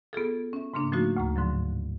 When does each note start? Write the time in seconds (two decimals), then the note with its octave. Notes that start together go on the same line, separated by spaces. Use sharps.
0.13 B3 F4 G#4 A4
0.53 C#4 E5
0.74 G#2 C#3 A#3 D4
0.92 F3 A3 A#3 C#4 D#4 F#4
1.16 D2 A2 A#5
1.36 G#2 D3 F3 F#3